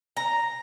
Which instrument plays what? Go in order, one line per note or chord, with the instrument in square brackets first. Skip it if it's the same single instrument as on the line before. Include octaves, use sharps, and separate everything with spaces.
[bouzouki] A#5